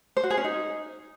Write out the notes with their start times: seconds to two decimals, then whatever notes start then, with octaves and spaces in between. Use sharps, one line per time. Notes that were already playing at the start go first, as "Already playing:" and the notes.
0.17 C5
0.23 F#4
0.30 G#4
0.37 C#4
0.44 D#4